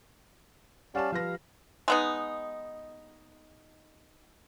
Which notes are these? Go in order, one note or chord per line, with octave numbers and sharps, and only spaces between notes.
G3 C#4 D5 F5 F#5 A5 E7
F3 B4 F5 A#6
G#3 B3 D#4